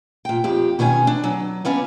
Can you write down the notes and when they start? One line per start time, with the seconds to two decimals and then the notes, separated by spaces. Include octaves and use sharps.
0.25 A#2 G5
0.44 F2 G4
0.79 B2 D#3 C#4 G#5
1.07 D4
1.24 F#3
1.65 A#3 B3 C#4 D4